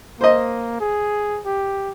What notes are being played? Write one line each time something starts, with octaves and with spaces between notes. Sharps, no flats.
A#3 C5 D#5
G#4
G4